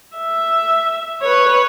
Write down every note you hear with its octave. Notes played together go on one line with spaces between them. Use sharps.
E5
B4 C#5